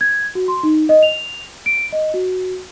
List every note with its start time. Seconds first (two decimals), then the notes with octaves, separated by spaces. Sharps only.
0.01 G#6
0.35 F#4
0.48 C6
0.63 D#4
0.89 D#5
1.03 F7
1.66 D7
1.92 D#5
2.14 F#4